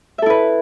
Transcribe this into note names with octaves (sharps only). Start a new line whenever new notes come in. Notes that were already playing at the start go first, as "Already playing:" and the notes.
E4 A4 B4 E5